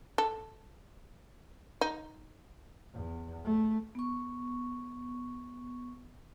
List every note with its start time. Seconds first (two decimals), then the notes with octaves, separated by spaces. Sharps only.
0.18 A4
1.81 D#4
2.94 E2
3.45 A3
3.95 B3 C#6